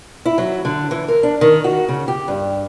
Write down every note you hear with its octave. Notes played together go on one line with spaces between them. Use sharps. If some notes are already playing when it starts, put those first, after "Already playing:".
E4
F#3
D3
E3
A#4
D4
D#3
F#4
C#3
G4
G2